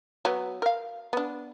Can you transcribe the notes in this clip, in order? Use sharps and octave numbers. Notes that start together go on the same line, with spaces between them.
F#3 B3
A#4 F5
B3 D4